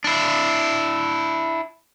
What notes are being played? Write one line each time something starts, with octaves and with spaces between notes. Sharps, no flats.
D4 E4